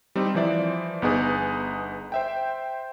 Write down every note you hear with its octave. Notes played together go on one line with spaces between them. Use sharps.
G3 C4 D#4
E3 F3 C5 D5 E5
G1 B3 D#4 G#4 G#5
C5 E5 G5